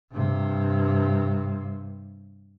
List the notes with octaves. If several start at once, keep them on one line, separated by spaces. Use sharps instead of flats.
G2 C3